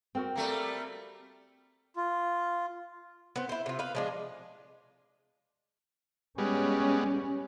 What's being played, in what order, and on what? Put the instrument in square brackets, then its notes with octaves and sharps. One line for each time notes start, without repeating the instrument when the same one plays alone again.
[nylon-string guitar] C4 [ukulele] F#4 A#4 G5
[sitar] G3 A3 A#3
[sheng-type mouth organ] F4
[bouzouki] B3 C4
E4 C5
C3 F4
B4 F5
F3 G#3 D4
[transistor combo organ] G3 G#3 B3 [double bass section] C#4